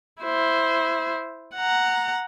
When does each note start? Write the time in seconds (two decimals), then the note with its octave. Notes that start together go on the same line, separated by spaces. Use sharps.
0.22 E4 C5
1.55 F#5 A#5